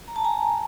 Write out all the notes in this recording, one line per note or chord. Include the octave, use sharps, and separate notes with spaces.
A#5
A5
G#5 A#5